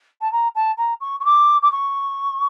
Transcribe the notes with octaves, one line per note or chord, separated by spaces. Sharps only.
A5
A#5
A5
A#5
C#6
C#6
D6
D6
C#6